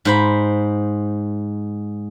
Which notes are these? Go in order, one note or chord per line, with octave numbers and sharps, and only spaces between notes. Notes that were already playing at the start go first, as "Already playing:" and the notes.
G#2 C5 B5